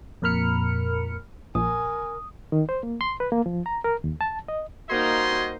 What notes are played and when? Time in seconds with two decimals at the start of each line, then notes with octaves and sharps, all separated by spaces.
0.22 F2 A#2 A#4 B5 F6 C#7
1.55 A#1 A#4 G#5 D#6
2.52 D#3
2.69 C5
2.83 A#3
3.01 C6
3.20 B4
3.32 A#3
3.46 F3
3.66 A#5
3.84 A#4
4.04 D#2
4.21 A5
4.48 D#5
4.90 G3 A#3 D#4 F#4 C5 D#5 C6 G#6